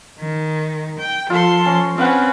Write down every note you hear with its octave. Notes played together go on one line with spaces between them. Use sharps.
D#3
G5
F3 F4 A4 C6
C#4
C4 C#4 B4 F5 F#5